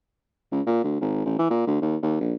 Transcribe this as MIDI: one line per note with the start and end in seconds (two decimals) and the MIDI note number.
0.52 0.61 37
0.67 0.81 46
0.84 0.97 38
1.01 1.25 32
1.26 1.35 33
1.39 1.47 52
1.50 1.65 46
1.67 1.77 38
1.82 1.96 39
2.03 2.16 39
2.21 2.34 34